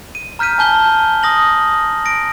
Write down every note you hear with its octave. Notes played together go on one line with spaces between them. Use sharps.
D#7
A#5 F6 G6 B6 D#7
G#5 A5 G6 G7
D#6 A#6 F#7
A#6 D7